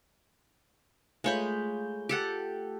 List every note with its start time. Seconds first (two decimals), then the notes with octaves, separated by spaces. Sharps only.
1.24 G#3 A3 F4 C#5 B5 G6
2.09 G4 A4 F#5